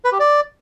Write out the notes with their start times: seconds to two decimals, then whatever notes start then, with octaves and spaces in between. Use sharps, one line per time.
0.05 B4
0.12 G4
0.20 D5